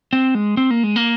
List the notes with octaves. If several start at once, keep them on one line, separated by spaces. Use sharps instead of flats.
C4
G#3
C4
A#3
G#3
A#3